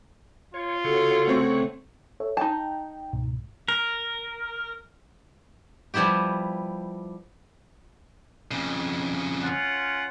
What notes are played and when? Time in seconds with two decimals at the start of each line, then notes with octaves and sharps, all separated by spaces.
0.54 F4 C#5
0.84 C#3 F#4 A4 C#5 F#5
1.28 A3 C4 C#6
2.20 A4 C#5 E5
2.37 D#4 G5 A5 A#5
3.13 C#2 G#2 B2
3.68 A#4
5.94 F3 G3 B3 E4 G4
8.51 F2 C#3
9.43 C#4 F4 F#5